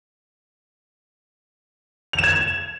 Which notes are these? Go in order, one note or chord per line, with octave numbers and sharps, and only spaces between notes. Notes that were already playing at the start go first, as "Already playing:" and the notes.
F7
E7
G#6